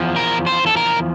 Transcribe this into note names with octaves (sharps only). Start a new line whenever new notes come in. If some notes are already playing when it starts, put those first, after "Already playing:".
Already playing: E2 F3
A#4
C5
A4
A#4